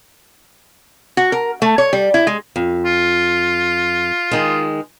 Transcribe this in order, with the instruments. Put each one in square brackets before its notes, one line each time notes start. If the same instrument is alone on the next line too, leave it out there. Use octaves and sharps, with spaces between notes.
[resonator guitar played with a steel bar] F#4
A#4
A3
C#5
G3
E4
G#3
[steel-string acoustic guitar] F2
[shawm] F4
[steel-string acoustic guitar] D#3 G#3